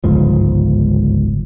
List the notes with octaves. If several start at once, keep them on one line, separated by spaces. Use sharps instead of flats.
G1 C#2 G#2 F3